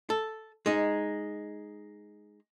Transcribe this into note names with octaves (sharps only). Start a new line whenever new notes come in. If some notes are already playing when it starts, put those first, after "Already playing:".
A4
G#3 D#4